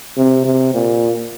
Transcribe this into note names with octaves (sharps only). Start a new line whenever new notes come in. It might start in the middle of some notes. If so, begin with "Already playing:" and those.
C3
C3
A#2